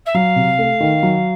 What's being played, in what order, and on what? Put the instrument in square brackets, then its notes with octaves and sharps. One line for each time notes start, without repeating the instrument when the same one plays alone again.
[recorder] E5
[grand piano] F#3 [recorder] F5
[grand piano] C3
A3
D#3
F#3